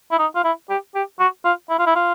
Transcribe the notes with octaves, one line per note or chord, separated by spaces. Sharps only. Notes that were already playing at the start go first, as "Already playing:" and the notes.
E4
D#4
F4
E4
G4
G4
F#4
F4
E4
F4
E4
F4